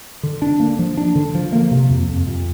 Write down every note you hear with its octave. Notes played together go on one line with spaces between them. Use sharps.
D3
D4
A#3
F3
D4
D3
F3
A#3
C3
F2
F2
F2